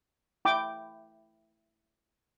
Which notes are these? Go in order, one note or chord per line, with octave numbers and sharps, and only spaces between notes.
E4 G5 D6